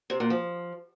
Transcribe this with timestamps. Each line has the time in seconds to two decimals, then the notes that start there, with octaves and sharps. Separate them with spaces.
0.10 C3
0.20 A#2
0.30 F3